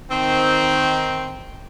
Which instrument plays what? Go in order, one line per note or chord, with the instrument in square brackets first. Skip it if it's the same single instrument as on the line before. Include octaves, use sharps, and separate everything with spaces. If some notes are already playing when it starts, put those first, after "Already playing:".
[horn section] D#3 C4